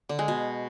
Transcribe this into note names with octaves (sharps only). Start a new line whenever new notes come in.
D3
G#3
B2